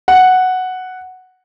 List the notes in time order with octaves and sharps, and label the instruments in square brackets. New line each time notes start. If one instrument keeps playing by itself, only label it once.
[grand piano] F#5